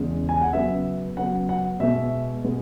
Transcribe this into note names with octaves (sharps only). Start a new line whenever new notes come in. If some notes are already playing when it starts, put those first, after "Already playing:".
Already playing: E2 C#3 G#3
G#5
F#5
C#3 F#3 B3 E5
C#3 F#3 B3 F#5
F#5
B2 G#3 B3 E5
B2 G#3 B3